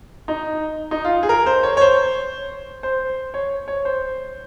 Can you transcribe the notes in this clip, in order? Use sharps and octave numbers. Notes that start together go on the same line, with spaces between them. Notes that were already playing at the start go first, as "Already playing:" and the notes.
D#4
D#4
F4
G#4
A#4
C5
C#5
C#5
C5
C5
C#5
C#5
C5